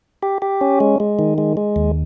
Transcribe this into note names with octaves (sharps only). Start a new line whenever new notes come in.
G4
G4
C#4
G#3
G#3
D#3
G#3
G#3
D#2